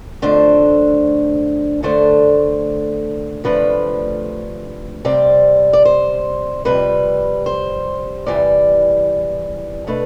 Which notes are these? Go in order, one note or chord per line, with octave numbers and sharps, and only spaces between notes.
F2 D3 A3 D4 C5
D2 D3 A3 D4 C5
D2 C3 F3 A3 D4 B4
C3 G3 C4 D5
D5
C5
F2 C3 G3 B4
C5
E2 C3 E3 G3 D5
B2 A3 D4 B4